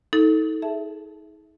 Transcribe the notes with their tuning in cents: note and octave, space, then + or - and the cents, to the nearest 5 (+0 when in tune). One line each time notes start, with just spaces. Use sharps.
D#4 +35 A4 +0
G#4 +20 E5 +0 A5 +0